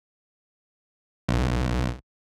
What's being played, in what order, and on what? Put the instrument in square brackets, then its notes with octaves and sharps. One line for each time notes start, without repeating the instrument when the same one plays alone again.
[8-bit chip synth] B1